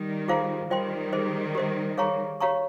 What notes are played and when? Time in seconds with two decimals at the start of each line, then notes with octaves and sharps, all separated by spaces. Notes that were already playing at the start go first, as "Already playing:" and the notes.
Already playing: D#3 G3
0.28 F4 G#4 C5 F5 A#5
0.70 D#3 G3 F4 C5 D#5 G5 C6
1.13 G#4 C5 D#5
1.55 G4 C5 D#5
1.98 G#4 C#5 F5 A#5 C#6
2.41 G4 C#5 F5 A#5 C#6